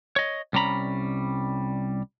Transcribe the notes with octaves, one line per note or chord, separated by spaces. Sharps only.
C#5 D#5
C2 G3 C#4 A#5 B5